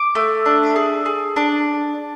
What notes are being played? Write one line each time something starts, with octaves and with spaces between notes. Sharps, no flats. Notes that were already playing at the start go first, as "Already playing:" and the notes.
Already playing: D6
A3
D4
G#4
G#4
D4